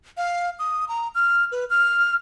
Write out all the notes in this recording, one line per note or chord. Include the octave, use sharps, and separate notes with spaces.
F5
D#6
A#5
F6
B4
F6